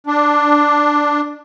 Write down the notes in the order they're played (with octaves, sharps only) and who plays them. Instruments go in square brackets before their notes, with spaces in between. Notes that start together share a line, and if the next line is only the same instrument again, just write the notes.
[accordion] D4